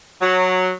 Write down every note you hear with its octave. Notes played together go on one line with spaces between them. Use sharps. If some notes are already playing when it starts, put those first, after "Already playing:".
F#3